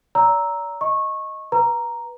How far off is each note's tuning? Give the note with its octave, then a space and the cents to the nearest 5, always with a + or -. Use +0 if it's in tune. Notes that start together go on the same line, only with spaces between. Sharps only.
D5 -40 A#5 +0 E6 -5
D#5 +0 C#6 -20
B4 -10 A#5 +0